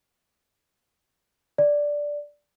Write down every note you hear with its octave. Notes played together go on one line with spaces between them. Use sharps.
D5